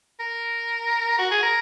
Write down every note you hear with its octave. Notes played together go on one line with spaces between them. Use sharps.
A#4
F#4
G#4
A#4